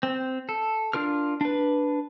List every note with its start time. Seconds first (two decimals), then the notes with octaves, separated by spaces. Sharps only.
0.03 C4
0.49 A4
0.93 D4 F4 A#4 F6
1.41 D4 B4